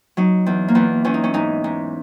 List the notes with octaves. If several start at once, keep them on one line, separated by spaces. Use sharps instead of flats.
F#3 D#4
E2
A#3
E2 B3
E2 C#4
D#4
C#4
G#2 D#4
G#2